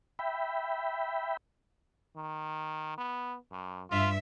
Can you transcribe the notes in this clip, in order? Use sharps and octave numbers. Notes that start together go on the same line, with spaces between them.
E5 G5 B5
D#3
B3
F#2
G2 F4 E5